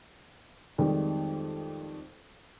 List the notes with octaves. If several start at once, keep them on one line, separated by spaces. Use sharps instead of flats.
F2 D#3 G3 G#3